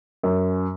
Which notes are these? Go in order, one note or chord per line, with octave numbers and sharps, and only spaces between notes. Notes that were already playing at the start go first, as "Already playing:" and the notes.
F#2